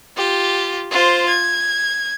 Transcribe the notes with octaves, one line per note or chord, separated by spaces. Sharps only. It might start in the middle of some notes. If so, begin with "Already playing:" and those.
F4 G4
F4 C5
G#6